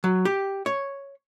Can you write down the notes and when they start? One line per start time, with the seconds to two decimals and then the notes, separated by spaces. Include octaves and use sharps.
0.04 F#3
0.25 G4
0.66 C#5